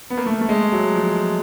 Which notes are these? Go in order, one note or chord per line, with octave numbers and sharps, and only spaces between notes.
B3
A#3
A3
A3
G#3
F#3
F3